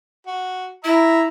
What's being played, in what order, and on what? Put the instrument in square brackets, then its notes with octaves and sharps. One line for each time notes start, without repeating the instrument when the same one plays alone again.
[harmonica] F#4
[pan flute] E4 [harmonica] E5 A#5